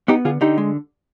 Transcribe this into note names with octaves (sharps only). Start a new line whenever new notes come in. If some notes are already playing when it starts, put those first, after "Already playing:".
B3 D#4 G4
D3 F4 G#4
D3 D#4 G4
G#3